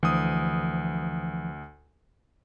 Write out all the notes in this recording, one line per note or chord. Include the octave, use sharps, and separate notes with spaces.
D2 E3 F3 D#6